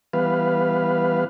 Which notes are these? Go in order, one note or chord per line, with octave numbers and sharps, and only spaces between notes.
E3 G3 B3 B4 F5